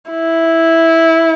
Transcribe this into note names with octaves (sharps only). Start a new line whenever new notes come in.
E4